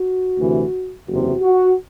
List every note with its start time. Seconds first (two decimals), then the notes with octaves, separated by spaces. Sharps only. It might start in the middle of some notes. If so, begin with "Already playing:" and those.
Already playing: F#4
0.38 D2 C3 E3
1.07 F#1 E2 C3 F#4
1.42 F#4